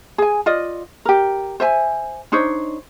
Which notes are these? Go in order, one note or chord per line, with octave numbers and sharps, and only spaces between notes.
G#4 G#5
F4 D5 D#5
G4 A#4
C5 E5 G#5
D4 D#4 C5 C#5